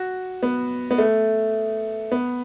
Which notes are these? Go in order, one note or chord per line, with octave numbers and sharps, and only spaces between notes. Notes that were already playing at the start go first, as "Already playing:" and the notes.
Already playing: F#4
B3
B3
A3
B3